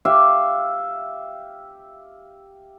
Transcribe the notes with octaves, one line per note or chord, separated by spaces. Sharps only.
G4 E5 F5